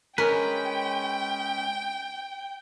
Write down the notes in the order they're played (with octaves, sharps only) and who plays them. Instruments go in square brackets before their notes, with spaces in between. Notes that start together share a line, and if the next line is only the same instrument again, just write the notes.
[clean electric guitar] G#3 C#4 B4 [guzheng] A#4 [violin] G5